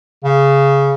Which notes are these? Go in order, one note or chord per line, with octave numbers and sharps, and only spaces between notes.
C#3